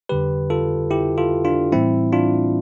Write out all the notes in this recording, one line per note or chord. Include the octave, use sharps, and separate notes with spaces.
F2 D3 G3 G4 B4
F4 A4
E4 G4
F4 A4
D4 F4
A2 E3 G3 C4 E4
D4 F4